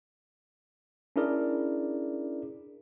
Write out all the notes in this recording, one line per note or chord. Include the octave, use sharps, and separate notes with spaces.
C#4 D4 E4 G#4 A#4 D5